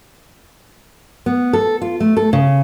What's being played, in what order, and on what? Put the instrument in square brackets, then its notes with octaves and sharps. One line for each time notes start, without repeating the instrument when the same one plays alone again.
[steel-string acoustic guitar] B3
A4
F4
A3
A4
C#3